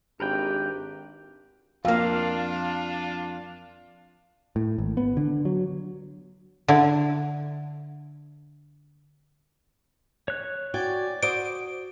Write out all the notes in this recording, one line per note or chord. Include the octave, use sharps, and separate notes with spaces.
G#1 D4 G4 A#4 B4 G5
F2 A#3 D4 F4 F5
A2
G#1
B3
D3
F#3
D3 E4
C#5 F#6
F#4 D5 G5 G#5
F#4 C5 D5 D6 D#6 D7